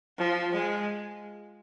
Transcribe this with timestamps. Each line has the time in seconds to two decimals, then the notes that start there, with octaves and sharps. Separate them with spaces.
0.18 F3
0.53 G#3